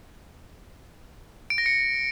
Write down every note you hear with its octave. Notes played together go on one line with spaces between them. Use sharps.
D7
A#6
C#7